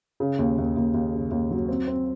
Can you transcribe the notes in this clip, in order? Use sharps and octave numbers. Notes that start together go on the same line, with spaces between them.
C#3
D#2
D#2
D#2
D#2
C#3
D#2
F#3
C4
C4